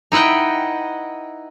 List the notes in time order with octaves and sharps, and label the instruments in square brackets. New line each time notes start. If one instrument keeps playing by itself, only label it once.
[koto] D#4 E4 B4 F#5 G5